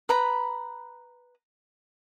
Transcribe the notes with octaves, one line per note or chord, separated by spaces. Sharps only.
B4 A#5 B5